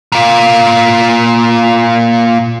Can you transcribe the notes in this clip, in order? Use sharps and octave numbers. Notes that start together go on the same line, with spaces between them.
A#2 F4